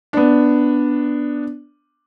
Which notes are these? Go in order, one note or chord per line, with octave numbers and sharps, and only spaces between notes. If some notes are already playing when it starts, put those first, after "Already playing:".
B3 D4